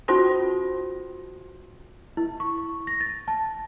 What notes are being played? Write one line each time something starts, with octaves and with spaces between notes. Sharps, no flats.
C#4 D#4 F4 F#4 A4 C5
E4
C#6
A#6
A6
A5